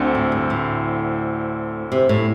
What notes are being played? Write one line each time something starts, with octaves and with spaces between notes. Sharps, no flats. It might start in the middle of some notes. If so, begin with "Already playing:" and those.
Already playing: D2 D3 C4
A2
G2
A2
C3
A2